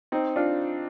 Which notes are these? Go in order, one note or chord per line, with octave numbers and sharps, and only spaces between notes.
C4 D#4
D4 F4